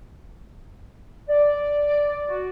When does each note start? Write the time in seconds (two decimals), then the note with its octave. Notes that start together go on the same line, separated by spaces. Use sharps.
1.28 D5
2.28 F#4